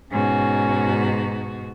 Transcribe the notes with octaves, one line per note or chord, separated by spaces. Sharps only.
G#2 B2 C#4 F#4